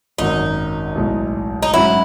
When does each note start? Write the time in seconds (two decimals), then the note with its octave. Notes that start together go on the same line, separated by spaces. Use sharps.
0.18 G#1 F#2 D#3 F#3 D#4
0.95 B1 A2 G#3
1.63 D#4
1.73 G#2 F#3 C#4 E4 F#4